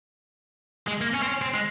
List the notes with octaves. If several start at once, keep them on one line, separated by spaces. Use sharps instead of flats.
G#3
A#3
C#4
C4
C#4
C4
G#3